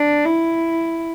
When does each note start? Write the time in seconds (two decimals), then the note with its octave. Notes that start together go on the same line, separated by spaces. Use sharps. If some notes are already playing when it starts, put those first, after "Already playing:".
Already playing: D4
0.26 E4